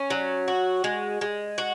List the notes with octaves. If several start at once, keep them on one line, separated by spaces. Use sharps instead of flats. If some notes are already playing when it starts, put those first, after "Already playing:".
Already playing: C#4
F#3
F#4
G#3
G#3
F#4